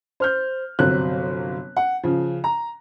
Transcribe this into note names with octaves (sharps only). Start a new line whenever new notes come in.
C5 F6 G6
G1 C3 F#3 C4 F#6
F#5
C#3 F3
A#5